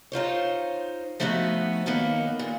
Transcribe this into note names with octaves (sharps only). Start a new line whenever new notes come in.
D#4 F4 C5 C#5
F3 A3 B3 D#4 F#4
F#2 D#3 A#3 B3 D#4
A#2